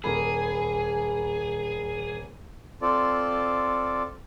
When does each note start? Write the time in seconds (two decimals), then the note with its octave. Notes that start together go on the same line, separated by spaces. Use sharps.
0.04 D#1 A#3 G#4 B5
2.82 C4 F4 A4 D5